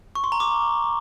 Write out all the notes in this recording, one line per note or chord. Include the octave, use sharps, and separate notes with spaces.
C#6
C6
A#5
D6